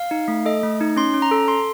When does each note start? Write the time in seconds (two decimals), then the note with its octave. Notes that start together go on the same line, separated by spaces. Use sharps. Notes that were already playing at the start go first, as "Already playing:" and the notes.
Already playing: F5
0.11 D#4
0.28 A3
0.46 A4 D#5
0.63 A3
0.81 D#4
0.97 C#4 C6
1.14 C#4
1.22 A#5
1.31 A4
1.48 A4 C6